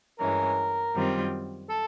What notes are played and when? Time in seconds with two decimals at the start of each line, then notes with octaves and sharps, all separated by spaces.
0.19 G2 E3 G#3 C#4 A#4
0.94 F#2 D#3 G3 C4 F4
1.70 A4